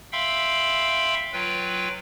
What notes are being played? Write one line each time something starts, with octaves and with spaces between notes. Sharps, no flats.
E5 F5 G5 B5 C6 E6
F#3 F4 B4 G5